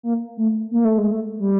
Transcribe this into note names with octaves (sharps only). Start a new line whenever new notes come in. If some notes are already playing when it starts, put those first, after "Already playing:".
A#3
A3
A#3
A3
G#3
A3
G3